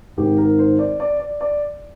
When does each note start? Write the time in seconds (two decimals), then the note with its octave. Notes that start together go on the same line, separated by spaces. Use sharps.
0.17 G#1 G#2 D#3 G4
0.38 A#4
0.59 C5
0.79 D5
1.00 D5
1.20 D5
1.41 D5